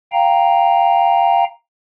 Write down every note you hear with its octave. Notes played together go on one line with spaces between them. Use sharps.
F5 G5 A#5